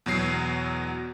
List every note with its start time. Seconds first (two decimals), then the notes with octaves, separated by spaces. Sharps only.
0.06 E2 B2 F#3 C7